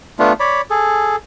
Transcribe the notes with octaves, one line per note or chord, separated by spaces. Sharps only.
A3 B3 D4 F4
C#5 D5 B5
G#4 A4